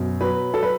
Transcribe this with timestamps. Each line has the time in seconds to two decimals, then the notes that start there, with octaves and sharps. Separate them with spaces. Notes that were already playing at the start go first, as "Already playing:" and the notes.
Already playing: F#2 B2
0.21 F#3 B4
0.54 F#3 A4
0.63 B4